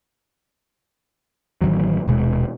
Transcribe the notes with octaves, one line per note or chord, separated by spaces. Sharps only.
A1 C3 D#3 F#3
D#1 B2 G#3